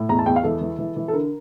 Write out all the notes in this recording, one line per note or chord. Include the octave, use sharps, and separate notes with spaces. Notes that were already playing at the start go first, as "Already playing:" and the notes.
Already playing: A2
E2 A#5
A5
E2 G5
F5
E3 A4
E3
E3
E3
A4
D3 A#4